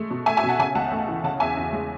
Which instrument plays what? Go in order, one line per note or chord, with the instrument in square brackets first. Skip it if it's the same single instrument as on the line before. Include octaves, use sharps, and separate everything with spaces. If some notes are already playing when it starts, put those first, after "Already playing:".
Already playing: [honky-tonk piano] G#3 A3
B2
A3 E5 G#5
E5 G#5
B2
F#5 A5
C#3 E5 G#5
C#2 F#5 A5
A3
E3
C#3 F#5 A5
E2 E5 G#5
E2
G#3